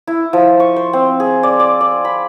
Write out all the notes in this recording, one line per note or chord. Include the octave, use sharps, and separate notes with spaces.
E4
F3
C#6
C5
C4
G#4
D5
D5
D5
B5